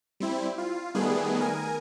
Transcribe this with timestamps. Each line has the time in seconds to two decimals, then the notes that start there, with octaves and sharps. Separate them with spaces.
0.20 G3 C4 E4
0.58 F4
0.95 D#3 G3 A3 B3 G#4
1.40 A#4 G#5